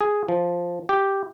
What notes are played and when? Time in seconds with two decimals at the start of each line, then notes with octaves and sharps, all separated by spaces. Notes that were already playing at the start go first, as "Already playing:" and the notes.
0.01 G#4
0.28 F3
0.89 G4